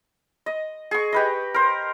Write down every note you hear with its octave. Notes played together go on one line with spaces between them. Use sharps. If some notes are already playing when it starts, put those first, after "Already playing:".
D#5
G#4 C#6
G4 B4 D#5
A#4 C5